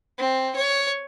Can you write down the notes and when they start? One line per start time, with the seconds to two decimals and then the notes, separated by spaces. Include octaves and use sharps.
0.18 C4
0.56 C#5